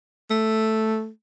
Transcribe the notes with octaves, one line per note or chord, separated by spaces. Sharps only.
A3